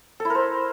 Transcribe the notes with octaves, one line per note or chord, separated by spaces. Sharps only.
A4
E4
A#4
C5